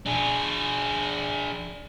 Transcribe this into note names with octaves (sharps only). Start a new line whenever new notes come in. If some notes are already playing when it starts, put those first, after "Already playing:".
D4 G#4